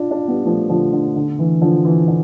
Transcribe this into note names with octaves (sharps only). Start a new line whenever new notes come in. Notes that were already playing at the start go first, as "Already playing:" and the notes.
Already playing: D4 F4
D4 F4
G3 B3
F3 A3
D3 F3
D3
D3
E3
D3 F3
E3
D3